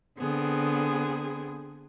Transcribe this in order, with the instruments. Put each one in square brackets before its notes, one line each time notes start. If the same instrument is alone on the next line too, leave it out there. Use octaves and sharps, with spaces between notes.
[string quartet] D3 B3 C4 G#4